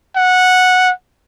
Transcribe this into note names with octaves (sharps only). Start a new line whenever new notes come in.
F#5